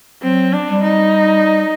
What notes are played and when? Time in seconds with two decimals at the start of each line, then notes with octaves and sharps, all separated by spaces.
0.23 F#3 C4
0.53 D4
0.68 G3
0.83 D#4